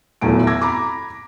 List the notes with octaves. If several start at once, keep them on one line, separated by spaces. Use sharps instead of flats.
D#1 E2 F#3 A3 D7
D6 E6 G#6 A#6
A#5 B5 D6